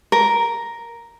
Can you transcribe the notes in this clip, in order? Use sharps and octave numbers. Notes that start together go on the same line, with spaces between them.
A#4